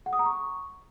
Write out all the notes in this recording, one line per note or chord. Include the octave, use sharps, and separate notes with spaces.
F#5
D#6
A#5
C#6